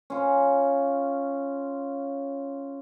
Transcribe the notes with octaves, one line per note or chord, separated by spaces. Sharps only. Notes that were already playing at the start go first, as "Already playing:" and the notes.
C#4 F4